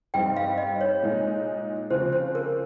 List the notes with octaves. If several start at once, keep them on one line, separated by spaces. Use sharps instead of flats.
G2 G3 C4 D#4 G5
F5
D#5
C#5
A#2 G#3 D#4
C#3 F3 C4 F4 C5
C5
A#4